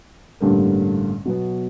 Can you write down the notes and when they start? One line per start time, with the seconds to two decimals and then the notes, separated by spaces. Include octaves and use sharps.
0.40 A1 G2 D3 G3 A#3
1.25 B2 F#3 B3